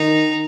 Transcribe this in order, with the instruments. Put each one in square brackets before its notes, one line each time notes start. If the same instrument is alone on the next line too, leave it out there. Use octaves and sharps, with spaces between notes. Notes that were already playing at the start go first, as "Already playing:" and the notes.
Already playing: [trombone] D#3 [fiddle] D#4